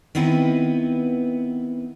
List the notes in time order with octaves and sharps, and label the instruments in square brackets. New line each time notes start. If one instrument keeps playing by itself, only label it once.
[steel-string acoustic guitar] D#3 B3 C4 E4 B4